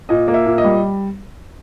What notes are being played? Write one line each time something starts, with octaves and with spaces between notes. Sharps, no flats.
A#2 D#5
A#3
E5
A#2
D#5
G3